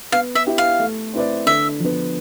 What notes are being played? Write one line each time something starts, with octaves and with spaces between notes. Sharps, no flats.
B3 F5
E5
E4 G4
F5
A3
C4 E4 B4 D5
D3 E5
F3 B3